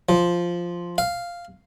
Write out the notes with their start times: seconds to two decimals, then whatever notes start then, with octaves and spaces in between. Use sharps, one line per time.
0.09 F3
0.98 F5